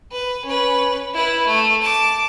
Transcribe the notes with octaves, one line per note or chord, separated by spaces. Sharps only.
B4
C#4 B4
E4 B4
A3
A5 D6